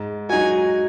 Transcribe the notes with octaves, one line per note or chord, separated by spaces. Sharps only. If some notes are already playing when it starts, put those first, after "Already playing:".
Already playing: G#2
F#3 D#4 F#4 G#5